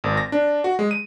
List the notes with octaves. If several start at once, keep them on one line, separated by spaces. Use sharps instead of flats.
G#1
A#6
D4
F#4
G#3
D#7